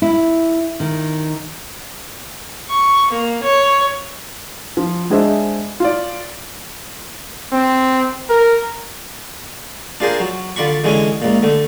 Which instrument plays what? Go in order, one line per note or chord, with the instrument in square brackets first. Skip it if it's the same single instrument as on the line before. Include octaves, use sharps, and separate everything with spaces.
[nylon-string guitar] E4
D#3
[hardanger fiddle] C#6
A#3
C#5
[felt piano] F3
G#3 D4 G#4 C5 D#5 E5
F4 D5
[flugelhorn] C4
A#4
[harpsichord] D4 F4 G#4 A#4 C5
F#3
D3 F4 D5 B5 C#6
D3 E3 G#3 C#4 E4
C#2 A#2
D3 A3